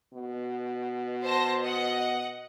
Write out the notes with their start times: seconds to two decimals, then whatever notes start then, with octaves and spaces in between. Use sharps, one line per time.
0.13 B2
1.22 C5 A5 A#6
1.62 D#5 F#5